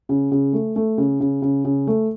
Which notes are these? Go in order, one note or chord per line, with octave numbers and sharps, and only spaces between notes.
C#3
C#3
A3
A3
C#3
C#3
C#3
C#3
A3